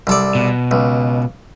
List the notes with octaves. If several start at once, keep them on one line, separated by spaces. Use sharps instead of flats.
C2 A4 D5
B2
C#2